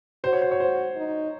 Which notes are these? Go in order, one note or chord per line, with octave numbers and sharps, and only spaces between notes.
F#4 C5
C#5
C5
C#5
C5
D#4